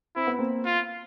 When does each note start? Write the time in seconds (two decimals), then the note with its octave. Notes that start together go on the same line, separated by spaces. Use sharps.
0.16 C4 E4
0.27 B3
0.38 A#3 C4
0.65 F4